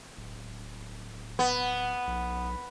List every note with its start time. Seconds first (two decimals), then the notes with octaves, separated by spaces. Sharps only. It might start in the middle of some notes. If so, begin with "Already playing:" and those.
0.17 D1
1.39 B3
2.07 B1